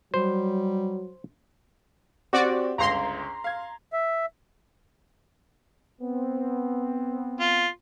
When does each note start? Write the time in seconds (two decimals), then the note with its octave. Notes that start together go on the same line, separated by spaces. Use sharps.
0.14 F#3 G3 C5
2.33 C4 F#4 G4 D5
2.78 G1 C#2 A#5 C6
3.44 F5 G#6
3.93 E5
6.01 B3 C4
7.40 F4